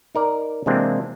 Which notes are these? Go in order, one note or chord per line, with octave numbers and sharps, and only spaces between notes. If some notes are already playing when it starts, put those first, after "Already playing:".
D#4 A#4 D5
C3 E3 G#3 A#3 C4 D4